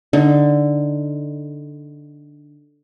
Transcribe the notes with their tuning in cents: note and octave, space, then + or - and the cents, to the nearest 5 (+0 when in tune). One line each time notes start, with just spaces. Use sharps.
D3 +0 D#4 +0